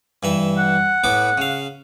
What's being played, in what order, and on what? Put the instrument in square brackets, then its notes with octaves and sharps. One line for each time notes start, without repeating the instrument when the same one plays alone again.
[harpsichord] G2 E3 E5
[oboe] F#5
[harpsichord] A2 B3 D6
C#3 F5